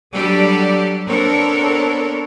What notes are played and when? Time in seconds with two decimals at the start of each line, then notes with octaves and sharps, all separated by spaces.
0.14 F#3 G3 D4 G4 A4 D5
1.09 B3 C4 D4 A4 A#4 C#5